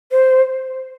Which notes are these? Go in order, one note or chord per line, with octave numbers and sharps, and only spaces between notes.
C5